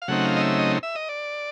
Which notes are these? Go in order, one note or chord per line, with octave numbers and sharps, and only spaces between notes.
F5
C#3 F#3 A3 C4 D#4 F#5
F5
D#5
E5
D#5
E5
D#5
D5